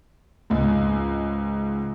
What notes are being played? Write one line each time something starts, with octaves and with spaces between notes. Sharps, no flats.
C#2 G#2